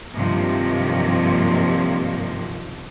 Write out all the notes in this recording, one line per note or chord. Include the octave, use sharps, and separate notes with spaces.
G2 C3 D#3 F3 F#3 A#3